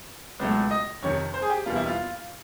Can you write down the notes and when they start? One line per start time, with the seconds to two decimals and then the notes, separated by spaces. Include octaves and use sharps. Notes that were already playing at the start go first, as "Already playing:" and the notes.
0.40 C#2 B2 F#3 A3
0.71 D#5
1.03 F2 C3 D#3 C#5
1.34 C5
1.42 G#4
1.50 G4
1.66 E2 B2 G3 A#3 F4
1.76 E4
1.86 F4